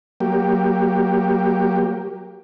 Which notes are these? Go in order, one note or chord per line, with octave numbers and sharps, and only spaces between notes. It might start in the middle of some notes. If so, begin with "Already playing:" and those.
F#3 A#3 G4